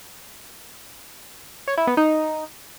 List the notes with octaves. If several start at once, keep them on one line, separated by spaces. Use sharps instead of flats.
C#5
E4
B3
D#4